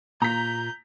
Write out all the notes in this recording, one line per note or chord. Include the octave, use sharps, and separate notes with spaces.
A#2 A#5 G6 B6